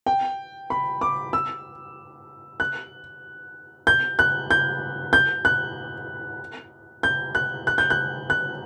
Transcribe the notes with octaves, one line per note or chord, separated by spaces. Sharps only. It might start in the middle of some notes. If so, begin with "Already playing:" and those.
G5
B5
D6
E6
F#6
G6
F#6
G6
G6
F#6
G6
F#6
F#6
G6
F#6
F#6